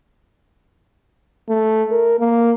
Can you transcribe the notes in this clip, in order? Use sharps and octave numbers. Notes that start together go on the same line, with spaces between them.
A3
A#4
A#3